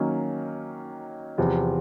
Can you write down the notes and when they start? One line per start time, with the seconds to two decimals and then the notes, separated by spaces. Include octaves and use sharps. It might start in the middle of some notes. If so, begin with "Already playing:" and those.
Already playing: D#3 F#3 A#3 C#4
1.38 E2 C3 F3